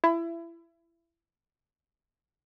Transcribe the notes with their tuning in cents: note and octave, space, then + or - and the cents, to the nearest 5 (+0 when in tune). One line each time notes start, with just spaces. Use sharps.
E4 +25